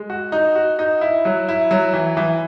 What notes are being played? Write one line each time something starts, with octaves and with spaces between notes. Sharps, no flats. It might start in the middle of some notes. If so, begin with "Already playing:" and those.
Already playing: G#3
F#4
D#4
F#4
D#4
E4
F#3
E4
F#3
E3
E3